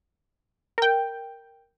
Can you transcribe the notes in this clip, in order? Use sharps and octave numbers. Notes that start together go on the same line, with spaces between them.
A#4 G5